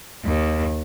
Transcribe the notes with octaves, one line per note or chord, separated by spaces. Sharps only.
D#2